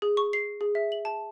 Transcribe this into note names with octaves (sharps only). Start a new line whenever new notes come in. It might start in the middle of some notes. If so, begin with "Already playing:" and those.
G#4
C#6
C7
G#4
E5
F#7
A5